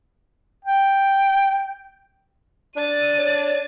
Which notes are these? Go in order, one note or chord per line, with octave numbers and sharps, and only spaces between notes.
G5
D4 A6 D#7
C#5